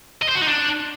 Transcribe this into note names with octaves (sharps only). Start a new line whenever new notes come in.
D#5
C5
F#4
D#4
D4